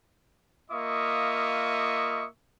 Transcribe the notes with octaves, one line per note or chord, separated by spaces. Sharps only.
A#3 F4 D#5 E5 C#6 D#6